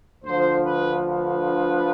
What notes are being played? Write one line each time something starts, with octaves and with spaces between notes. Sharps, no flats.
D2 D3 F3 C5
B4
B4